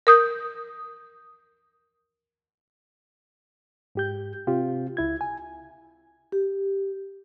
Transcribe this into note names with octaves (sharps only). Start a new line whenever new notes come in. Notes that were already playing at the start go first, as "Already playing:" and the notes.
A#4 D#6 G6
G#2 G4 G6
C3 C4 F4 G4
C#2 E4 G#6
G#5
G4